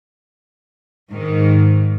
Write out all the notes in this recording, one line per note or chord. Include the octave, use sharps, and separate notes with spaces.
G#2 D#3